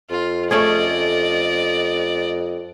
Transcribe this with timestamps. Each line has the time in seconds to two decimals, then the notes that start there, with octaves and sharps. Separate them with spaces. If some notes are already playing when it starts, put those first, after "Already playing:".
0.10 F2 F4
0.51 A3 C#4 G#4 D5 D#5